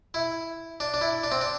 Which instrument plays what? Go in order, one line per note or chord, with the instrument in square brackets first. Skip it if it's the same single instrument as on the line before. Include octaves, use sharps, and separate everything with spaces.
[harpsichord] E4
D4
D4
E4
D4
C4
D4